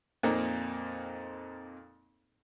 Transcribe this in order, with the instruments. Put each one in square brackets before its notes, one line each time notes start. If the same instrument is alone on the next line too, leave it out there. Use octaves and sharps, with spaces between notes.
[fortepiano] F2 A#2 A#3 C4 D#4